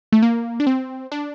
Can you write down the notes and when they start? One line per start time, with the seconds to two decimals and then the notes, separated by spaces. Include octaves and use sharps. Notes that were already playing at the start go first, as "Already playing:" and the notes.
0.12 A3
0.22 A#3
0.60 D4
0.67 C4
1.12 D4